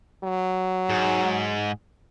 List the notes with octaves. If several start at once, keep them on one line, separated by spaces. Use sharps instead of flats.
F#3
G#2